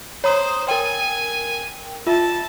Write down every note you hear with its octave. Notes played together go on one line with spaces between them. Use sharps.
C5 C#5 A#5 D#6
A#4 G5 G#5
F4 E5 A5